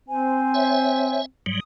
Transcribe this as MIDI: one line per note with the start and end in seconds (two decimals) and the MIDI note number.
0.09 1.24 60
0.09 1.20 72
0.09 1.20 80
0.54 1.25 73
0.54 1.25 76
1.46 1.60 44
1.46 1.60 54
1.46 1.60 55
1.46 1.62 87